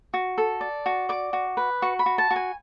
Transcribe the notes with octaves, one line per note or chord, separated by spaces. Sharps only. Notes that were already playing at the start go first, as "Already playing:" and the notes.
F#4
A4
D5
F#4
D5 D6
F#4
B4
F#4 C#6
B5
F#4
A5
F#4
G#5